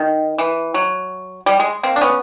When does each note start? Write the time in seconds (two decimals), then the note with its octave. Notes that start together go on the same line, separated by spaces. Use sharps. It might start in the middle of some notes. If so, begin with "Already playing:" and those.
Already playing: D#3
0.38 E3
0.74 F#3
1.46 G3
1.60 G#3
1.83 A#3 C4
1.96 D4
2.01 B3 C#4